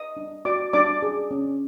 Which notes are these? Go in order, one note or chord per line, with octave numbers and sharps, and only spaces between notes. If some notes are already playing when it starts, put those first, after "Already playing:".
Already playing: B4 D#5 D#6
D4
F#4 D5 D6
D4 D5 D6
G#4
C#4